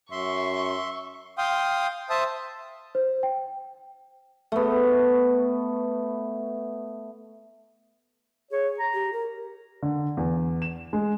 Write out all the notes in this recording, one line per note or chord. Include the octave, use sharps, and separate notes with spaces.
F#2 E5 C6 C#6
F5 G5 C6 D#6
C5 E5 A5 D#6
C5
G5
A3 B3
G#4 C#5
A#5
G4
A#4
D3
E2
E7
G#3